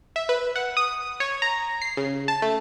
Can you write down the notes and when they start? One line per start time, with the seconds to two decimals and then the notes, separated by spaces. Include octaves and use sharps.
0.16 E5
0.29 B4
0.56 F#5
0.77 D#6
1.20 C#5
1.42 A#5
1.82 C7
1.97 C#3
2.28 A5
2.42 A3